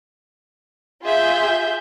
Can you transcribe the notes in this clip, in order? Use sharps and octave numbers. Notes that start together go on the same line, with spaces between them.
F4 G#4 E5 G6